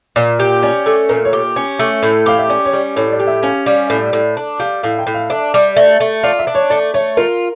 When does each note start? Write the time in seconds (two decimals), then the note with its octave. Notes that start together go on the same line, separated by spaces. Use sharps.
0.16 A#2 D5
0.40 G4
0.62 C#4 D5
0.86 A3
1.09 A#2 A#4
1.25 C#5
1.33 G4
1.56 C#4
1.79 A3
2.03 A2
2.26 G4 F5
2.39 E5
2.50 C#4 D5
2.65 C#5
2.73 G3
2.96 A2 C#5
3.12 D5
3.19 G4
3.27 E5
3.43 C#4 F5
3.66 G3 F5
3.90 A2
4.13 A2
4.37 D4
4.60 G3 F5
4.83 A2 F5
4.99 G5
5.07 A2
5.14 F5
5.30 D4 E5
5.54 G3
5.76 A3
6.00 A3
6.24 F4 D5
6.39 E5
6.47 D4
6.55 C#5
6.70 A3 D5
6.94 A3 C#5
7.17 F4 A#4